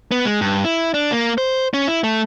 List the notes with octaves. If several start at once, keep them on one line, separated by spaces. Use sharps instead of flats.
B3
G#3
G2
E4
D4
A#3
C5
C#4
E4
A3